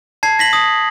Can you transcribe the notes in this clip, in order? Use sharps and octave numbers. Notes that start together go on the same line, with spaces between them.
A5 G#6 C7
A#6 B6 F#7
D#6